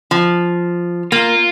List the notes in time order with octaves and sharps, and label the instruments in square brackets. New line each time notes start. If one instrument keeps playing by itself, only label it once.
[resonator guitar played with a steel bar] F3
[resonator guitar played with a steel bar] A#3 [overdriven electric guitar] F4